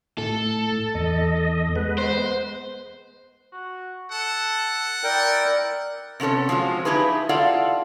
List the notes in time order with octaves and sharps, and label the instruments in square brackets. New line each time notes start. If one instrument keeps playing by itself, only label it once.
[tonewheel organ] A2 [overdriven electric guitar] A4
[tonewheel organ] E2 D#5
G#3 B3 B4
[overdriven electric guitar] C5
[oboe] F#4
[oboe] A4 [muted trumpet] F#5
[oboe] E4 [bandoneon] A#4 G5 [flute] D5
[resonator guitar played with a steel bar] C3 B3 C#4 A4 C#5
F3 F#3 G#3 F4
D#4 E4 G4 G#4 B4
F4 A4 D5 F5 F#5